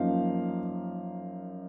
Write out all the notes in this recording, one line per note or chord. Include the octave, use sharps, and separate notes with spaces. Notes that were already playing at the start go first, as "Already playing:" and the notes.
Already playing: F#2 F3 A#3 D#4 F5